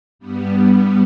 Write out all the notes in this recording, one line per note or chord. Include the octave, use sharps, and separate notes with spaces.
G2 G3 B3